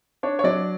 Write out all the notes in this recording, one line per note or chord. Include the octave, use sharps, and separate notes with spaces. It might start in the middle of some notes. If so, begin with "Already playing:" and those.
D4 C#5
C#5
F#3 D5